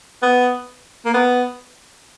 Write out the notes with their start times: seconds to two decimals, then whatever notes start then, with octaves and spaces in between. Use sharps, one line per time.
0.22 B3
1.05 A#3
1.14 B3